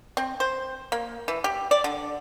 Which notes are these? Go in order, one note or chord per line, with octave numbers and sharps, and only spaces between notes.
C4
C5
A#3
E3
G4
D5
D3